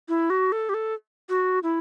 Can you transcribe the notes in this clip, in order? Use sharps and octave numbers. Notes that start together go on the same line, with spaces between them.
E4
F#4
A4
G4
A4
F#4
E4